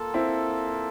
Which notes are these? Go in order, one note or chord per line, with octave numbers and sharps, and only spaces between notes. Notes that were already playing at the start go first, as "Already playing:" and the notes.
Already playing: A#3 F4 A4
C4 E4